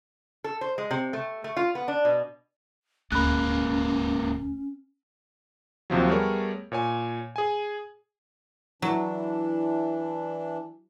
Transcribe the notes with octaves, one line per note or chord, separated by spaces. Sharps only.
A4
C5
G#3
C3
A3
A3
F4
B3
D4
B2
D#1 D2 G#2 A#3 C#4 B5 F#6
D#2 C3 F3 F#3
G3 A3 B3 G#4 A#4 C#5
A#2 C#5 G#5
G#4 G#5
E3 F#3 D4 E4